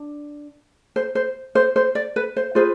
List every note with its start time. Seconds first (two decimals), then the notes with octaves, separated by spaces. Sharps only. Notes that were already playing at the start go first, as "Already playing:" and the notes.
Already playing: D4
0.96 C5
1.15 C5
1.55 C5
1.76 C5
1.95 D5
2.16 B4
2.36 C5
2.55 F4 G#4 B4 C5